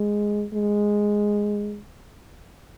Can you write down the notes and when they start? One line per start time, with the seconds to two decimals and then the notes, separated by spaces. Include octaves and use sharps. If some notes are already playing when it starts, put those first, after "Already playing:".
Already playing: G#3
0.54 G#3